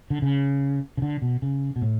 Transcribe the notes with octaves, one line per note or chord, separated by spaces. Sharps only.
D3
C#3
C#3
D3
B2
C#3
B2
A2